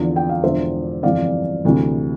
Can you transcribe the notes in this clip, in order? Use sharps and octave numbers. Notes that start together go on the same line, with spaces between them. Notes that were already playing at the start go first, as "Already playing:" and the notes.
Already playing: E2 D3 F3
G5
F5
E1 E2 D3 F3 C5 E5
G1 F2 E3 G3 D5 F5
D2 C3 E3